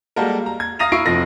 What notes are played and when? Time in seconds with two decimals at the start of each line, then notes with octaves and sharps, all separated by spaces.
0.16 G3 G#3 A#3 F#4 A4 A#4
0.46 A#5
0.60 G#6
0.79 F5 A#5 D#6 A#6 D#7 F7
0.92 E4 F5 C#6 E6 C7 D7
1.06 F1 F3 A#6